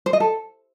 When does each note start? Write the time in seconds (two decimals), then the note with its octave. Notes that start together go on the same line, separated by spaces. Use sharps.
0.06 C5
0.13 D#5
0.20 A4